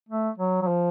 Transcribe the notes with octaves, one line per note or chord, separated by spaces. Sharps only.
A3
F#3
F#3
F3